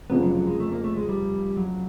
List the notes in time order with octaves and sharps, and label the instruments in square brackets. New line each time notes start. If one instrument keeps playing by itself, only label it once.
[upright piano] F1 F2 C#3 F3 [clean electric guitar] B3
[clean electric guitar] F#3
F#3
G#3
A3
A#3
A3
G#3
G3
F#3